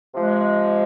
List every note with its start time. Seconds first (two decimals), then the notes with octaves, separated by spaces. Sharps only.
0.15 C3 F3 G#3